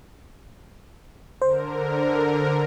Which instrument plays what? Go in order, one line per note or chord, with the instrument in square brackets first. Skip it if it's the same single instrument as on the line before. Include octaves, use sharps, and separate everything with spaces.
[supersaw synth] D3 A#4 [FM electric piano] C5